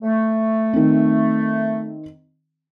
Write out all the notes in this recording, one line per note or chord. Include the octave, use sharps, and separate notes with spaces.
A3
D#3 C4